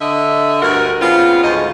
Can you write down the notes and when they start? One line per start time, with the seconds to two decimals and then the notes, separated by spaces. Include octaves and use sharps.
0.01 D3 D#5 E5
0.62 D2 G2 F#4 A#4
1.01 C#3 B3 C4 F4
1.43 D2 G#2 F4 G#4 C5 D#5